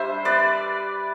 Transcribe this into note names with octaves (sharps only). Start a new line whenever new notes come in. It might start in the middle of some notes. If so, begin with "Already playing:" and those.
Already playing: G3 D4 C5 E5
B4 D5